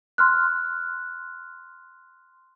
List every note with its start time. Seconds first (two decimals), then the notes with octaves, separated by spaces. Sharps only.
0.18 C6 F6 F#6